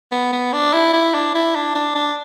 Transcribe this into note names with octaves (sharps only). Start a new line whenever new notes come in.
B3
B3
D4
E4
E4
D4
E4
D4
D4
D4